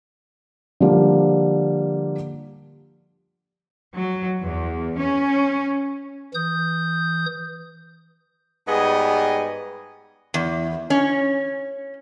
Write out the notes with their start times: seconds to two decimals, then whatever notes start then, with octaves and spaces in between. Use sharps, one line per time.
0.80 D3 F3 G3 A#3
3.96 F#3
4.42 E2
4.98 C#4
6.34 E3 D#6 G6
8.67 G#2 G3 B3 G#4 D#5 G#5
10.34 E2
10.90 C#4